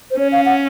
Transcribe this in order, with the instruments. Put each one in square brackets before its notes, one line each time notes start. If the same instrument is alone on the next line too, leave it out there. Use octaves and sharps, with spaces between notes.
[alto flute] C5
[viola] C#4 [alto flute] C#5
[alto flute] F5
F#5